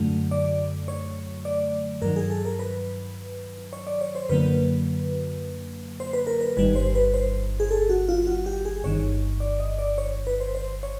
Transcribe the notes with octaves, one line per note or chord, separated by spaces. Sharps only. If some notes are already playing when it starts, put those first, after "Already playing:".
Already playing: F#2 D3 F#3 A3
D5
C#5
D5
G2 D#3 F#3 A#4
G#4
A4
A#4
B4
C#5
D5
C#5
C5
F#2 D3 F#3 A#3 B4
C5
B4
A#4
B4
G1 G2 D#3 G3 B4
C5
B4
C5
G#4
A4
F#4
F4
F#4
G4
G#4
G1 G2 D#3 C#5
D5
D#5
D5
C#5
B4
C5
C5
C#5